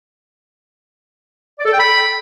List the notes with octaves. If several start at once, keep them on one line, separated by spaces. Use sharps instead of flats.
D5
A4
G5
B5